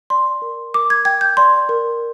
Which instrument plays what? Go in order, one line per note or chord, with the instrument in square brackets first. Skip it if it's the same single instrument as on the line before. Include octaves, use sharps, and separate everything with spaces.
[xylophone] D5 C6
A#4
A#4 D6
G#6
G5 G#6
G6
D5 C6
A#4